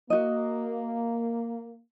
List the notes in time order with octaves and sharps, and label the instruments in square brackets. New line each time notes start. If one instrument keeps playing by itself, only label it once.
[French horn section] A#3 [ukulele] F#4 D#5